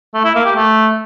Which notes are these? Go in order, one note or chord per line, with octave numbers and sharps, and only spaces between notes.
A3
E4
A#3
G4
A3